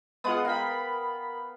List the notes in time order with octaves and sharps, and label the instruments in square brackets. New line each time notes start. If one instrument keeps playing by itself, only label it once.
[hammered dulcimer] G#3 B3 [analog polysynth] F4 F#5 D#6
[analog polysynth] A#4 B5 [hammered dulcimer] F5 G5